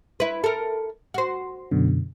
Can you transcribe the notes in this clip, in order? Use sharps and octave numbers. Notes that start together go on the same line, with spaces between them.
E4 B4
A4 A#4
F#4 C5
F#2 B2 D3